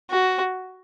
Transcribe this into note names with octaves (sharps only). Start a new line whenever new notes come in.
F#4